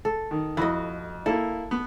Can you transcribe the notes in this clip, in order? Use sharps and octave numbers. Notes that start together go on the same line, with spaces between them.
A4
D#3
F2 E4 F#4 D#5
A#3 E4 A4
B3